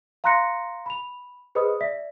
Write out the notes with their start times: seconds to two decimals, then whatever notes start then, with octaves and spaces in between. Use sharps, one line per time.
0.24 F5 A#5 C6 F#6 A#6 C#7
0.86 B5 F7
1.55 G#4 B4 C5 D#5 B5 D#6
1.81 D5 E5 B6